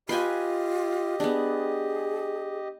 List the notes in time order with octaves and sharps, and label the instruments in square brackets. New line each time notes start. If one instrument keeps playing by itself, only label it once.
[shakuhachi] F4 [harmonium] G4 D#5 [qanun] B4 G5 G#5
[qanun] B3 D4 [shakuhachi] G#4